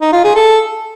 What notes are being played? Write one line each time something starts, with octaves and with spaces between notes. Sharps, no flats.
D#4
F4
G#4
A4